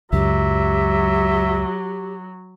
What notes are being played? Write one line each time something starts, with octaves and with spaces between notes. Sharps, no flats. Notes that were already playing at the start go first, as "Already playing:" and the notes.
C#2 F#2 F#3 G4 E5